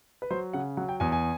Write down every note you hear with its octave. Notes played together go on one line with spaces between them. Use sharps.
B4
F#3 C5
C#3 F#5
F#3 F#5
G5
E2 G#5
G#5